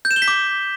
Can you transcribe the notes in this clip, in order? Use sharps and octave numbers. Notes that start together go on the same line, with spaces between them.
G6
E7
G7
B6
D6